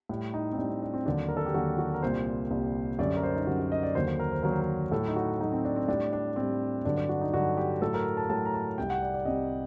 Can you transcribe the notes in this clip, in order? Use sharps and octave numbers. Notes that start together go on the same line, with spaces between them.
A2 G3
D#4
C4
A2 G3 D4
C4
D4
C4
D#2 D3 F#3 D4
A#4
A4
G4
D#2 D3 F#3 F#4
F#4
A#4
C2 A#2 G3 C5
C2 A#2 G3
F#2 D3 G3 D5
A#4
C5
D#4
F#2 D3 G3 F#4
F#4
D#5
D5
D#2 D3 F#3 C5
C5
A#4
C5
D#2 D3 F#3 A#4
C5
A#4
A2 F#3 A4
D#4
F#4
A2 F#3 D#4
C4
D4
C4
A2 G3 D4
D4
A2 G3 C4
G2 D3 F#3 D4
D4
F#4
D#4
G2 D3 F#3 F#4
G4
A2 F#3 A4
A#4
A5
A2 F#3 A5
A#5
A5
C2 C3 G3 G5
F#5
D5
D5
C2 C3 G3 D#5